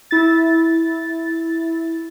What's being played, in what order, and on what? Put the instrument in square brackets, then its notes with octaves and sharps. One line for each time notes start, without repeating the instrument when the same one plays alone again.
[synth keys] E4 A6